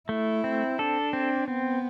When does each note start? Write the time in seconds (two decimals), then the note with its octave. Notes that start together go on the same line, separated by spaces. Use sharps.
0.09 A3 E4
0.44 C4
0.79 D4 A4
1.13 C4
1.48 B3 C4